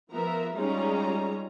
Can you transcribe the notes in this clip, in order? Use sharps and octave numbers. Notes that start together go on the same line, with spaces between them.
F3 B3 A#4 E5 A#5
G3 G#3 C#4 D#4 F4 A#5